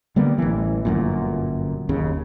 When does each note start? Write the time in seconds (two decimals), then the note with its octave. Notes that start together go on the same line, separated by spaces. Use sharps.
0.16 D3 G3 A#3 B3
0.38 A1 E3
0.85 G1 F#2 A#2
1.89 F#1 D#2 C#3